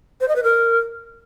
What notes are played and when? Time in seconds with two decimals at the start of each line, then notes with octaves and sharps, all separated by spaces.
0.21 C5
0.28 D#5
0.36 B4
0.43 A#4